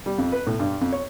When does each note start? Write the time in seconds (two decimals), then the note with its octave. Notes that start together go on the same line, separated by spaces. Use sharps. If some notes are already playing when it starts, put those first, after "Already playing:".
0.06 G3
0.18 F2
0.32 B4
0.47 A2
0.59 G2
0.81 F2
0.93 C#5